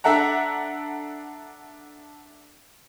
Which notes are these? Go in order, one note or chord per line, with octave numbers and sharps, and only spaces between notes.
D4 A4 E5 F#5 A#5